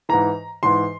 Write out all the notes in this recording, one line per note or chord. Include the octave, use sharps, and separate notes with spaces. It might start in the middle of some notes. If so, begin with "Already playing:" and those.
G#2 E3 A#5
G#2 E3 C6